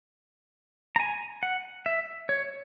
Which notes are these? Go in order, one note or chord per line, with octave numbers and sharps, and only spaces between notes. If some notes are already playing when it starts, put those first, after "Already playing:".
A#5
G#5
F#5
E5
C#5